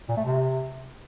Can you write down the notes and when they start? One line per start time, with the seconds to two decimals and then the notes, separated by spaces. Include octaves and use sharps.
0.08 A#2
0.17 A3
0.25 C3